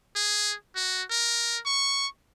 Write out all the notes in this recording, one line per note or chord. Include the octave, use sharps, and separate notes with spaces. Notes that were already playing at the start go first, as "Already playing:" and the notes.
G#4
F#4
A#4
C#6